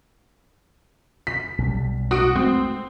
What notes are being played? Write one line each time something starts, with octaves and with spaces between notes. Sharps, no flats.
B6
B1 C3 G3
F#4 D#6 D7
G#3 A3 C4